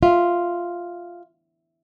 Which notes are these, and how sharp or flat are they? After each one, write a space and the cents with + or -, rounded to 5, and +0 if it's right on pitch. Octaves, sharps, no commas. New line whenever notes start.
F4 +0 E5 +0